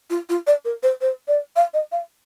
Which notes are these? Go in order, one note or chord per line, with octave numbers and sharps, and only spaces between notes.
F4
F4
D5
A#4
C5
C5
D5
F5
D#5
F5